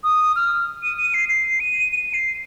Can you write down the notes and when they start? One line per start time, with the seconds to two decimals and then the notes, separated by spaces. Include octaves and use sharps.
0.04 D#6
0.36 F6
0.83 D#7
0.97 D#7
1.14 C7
1.29 C7
1.60 D#7
1.92 D#7
2.13 C7